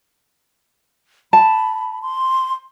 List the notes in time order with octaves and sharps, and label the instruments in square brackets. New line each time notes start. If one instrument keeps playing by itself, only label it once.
[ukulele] A5 [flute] B5
[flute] C6